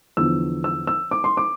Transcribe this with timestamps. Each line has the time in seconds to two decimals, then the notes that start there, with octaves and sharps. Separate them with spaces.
0.17 E2 D3 F3 E6
0.64 E6
0.87 E6
1.11 D6
1.24 C6
1.37 D6